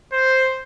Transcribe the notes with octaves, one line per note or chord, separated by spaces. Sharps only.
C5